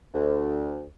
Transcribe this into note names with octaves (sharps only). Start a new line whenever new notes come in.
D2